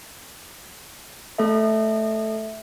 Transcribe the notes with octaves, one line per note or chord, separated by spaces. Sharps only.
A3 A4 E5